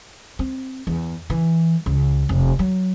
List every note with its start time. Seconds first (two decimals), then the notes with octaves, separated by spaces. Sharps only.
0.39 C4
0.87 E2
1.30 E3
1.86 C#2
2.29 F1
2.59 F#3